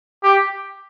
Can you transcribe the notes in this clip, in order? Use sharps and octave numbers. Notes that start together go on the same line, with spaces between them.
G4